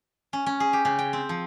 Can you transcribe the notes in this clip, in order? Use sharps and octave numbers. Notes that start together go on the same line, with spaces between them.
C#4
C#4
G#4
G4
C#3
G5
C4
F3